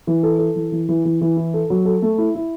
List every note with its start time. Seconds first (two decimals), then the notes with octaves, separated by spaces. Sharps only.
0.07 E3
0.23 A4
0.39 A4
0.56 E3
0.72 E3
0.89 E3
1.05 E3
1.21 E3
1.37 E4
1.54 A4
1.70 F#3
1.85 A4
2.02 A3
2.18 E4
2.35 E4